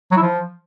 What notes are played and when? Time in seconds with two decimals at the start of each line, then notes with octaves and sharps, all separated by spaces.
0.11 F#3
0.17 E4
0.22 F3